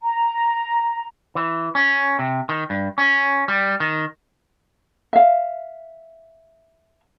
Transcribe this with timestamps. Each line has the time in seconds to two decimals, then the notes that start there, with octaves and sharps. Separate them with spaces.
0.01 A#5
1.35 E3
1.75 C#4
2.19 C3
2.49 D#3
2.70 G2
2.98 C#4
3.48 G3
3.80 D#3
5.13 E5 F5